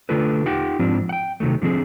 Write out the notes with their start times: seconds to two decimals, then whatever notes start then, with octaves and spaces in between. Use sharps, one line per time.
0.09 D3 A3 D4 F4 A4 B4
0.46 D#4 F4 G4 F#5 G5
0.79 G#2 F3 C4 D4 F4
1.09 F#5 G5
1.40 C3 D#3 F#3 A3
1.62 D3 F3 C4 G#4